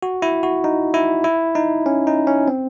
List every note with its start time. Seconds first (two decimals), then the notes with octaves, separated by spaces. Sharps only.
0.03 F#4
0.22 E4
0.43 F#4
0.64 D#4
0.94 E4
1.24 E4
1.55 D#4
1.86 C#4
2.07 D#4
2.27 C#4
2.48 C4